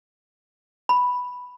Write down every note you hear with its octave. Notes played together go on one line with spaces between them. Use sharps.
B5